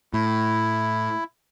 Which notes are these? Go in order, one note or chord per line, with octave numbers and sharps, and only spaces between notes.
A2 E4